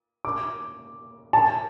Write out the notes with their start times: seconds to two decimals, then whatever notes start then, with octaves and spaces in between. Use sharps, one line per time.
0.25 D6
1.33 A5